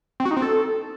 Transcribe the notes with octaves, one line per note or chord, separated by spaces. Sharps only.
C4
F#4
D#4
C4
A4